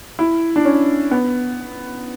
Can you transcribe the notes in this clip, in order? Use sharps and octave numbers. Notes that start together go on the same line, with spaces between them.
E4
D4
C#4
B3